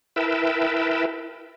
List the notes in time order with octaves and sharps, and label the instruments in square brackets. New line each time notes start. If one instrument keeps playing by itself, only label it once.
[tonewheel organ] E4 A#4 B4 E5 G5 A5